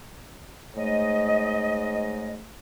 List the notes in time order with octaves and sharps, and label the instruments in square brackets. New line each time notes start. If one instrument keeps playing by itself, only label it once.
[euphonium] G#2 [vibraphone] A3 C#5 [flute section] D#5